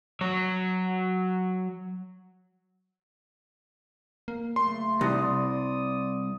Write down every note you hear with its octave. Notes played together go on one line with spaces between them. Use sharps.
F#3 C#5
A#3
C#3 F#3 A3 C6
C2 G3 D5 D#6